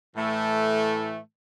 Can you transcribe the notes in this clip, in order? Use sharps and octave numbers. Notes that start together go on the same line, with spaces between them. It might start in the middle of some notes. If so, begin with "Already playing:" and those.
A2 E3 A3